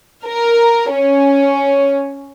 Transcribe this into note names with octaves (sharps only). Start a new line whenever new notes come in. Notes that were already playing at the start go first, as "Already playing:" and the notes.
A#4
C#4